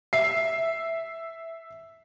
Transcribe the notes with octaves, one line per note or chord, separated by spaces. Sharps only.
E5 C7